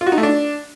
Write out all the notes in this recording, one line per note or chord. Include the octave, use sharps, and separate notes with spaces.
F4
F#4
D#4
A3
D4